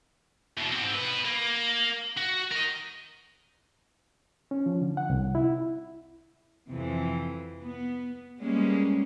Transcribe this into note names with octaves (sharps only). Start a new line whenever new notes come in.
E2 B2
G#2 C4
B2 B4
A#3
F#4
A#4 D#5
C#4
F3
D3
F#5
C2
E4
F2 C3 E3
B3
G3 G#3 A#3 B3 C#4